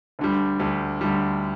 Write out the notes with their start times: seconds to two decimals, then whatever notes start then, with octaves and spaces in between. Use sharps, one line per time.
0.19 D2 D3 G3
0.60 D2 D3 G3
1.01 D2 D3 G3